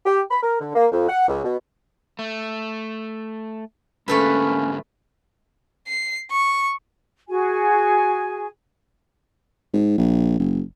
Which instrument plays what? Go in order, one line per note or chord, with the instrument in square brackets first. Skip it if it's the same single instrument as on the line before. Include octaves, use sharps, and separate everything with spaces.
[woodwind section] G4
B5
A#4
D3
A#3
F2
F#5
C#2
B2
[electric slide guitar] A3
[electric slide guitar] G#2 D3 G4 [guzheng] A3 A4 B4 [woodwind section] A#3 C#4
[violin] C7
C#6
[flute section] F#4 G#4 G#5
[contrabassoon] G#2
A#1
F#1